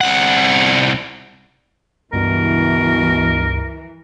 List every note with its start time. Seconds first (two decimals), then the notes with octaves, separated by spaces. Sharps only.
0.01 C2 F#5
2.13 C#2 G2 B2 E3 A#4